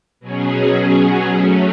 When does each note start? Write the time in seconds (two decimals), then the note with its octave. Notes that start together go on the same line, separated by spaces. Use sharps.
0.20 B2 F#3 C#4 G#4
1.34 F#3 A3 C#4